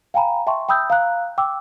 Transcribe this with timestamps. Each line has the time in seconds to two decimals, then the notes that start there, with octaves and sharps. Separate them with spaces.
0.14 F5 G5 G#5 A#5 B5
0.47 E5 G5 A5 C6 C#6
0.69 G5 B5 D#6 E6 G6
0.90 F5 A#5 F#6
1.38 G5 D6 E6